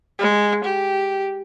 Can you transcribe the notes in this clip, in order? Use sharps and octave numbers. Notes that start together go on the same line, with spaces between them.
G#3
G4